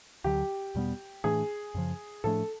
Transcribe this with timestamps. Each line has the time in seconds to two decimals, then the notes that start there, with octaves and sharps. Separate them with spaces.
0.24 D2 D3 F#3 G4
0.75 E2 B2 G3 B3
1.24 A2 E3 A3 D4 G#4
1.75 F#2 C#3 F3
2.24 A2 F3 A3 D4 A4